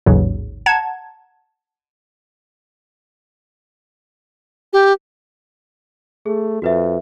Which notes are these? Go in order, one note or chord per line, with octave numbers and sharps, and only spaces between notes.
A1 D#2 G#2 C#3 F#3
F#5 A5 A#5 G#6
G4
A3 G#4
F2 F#4 B4 E5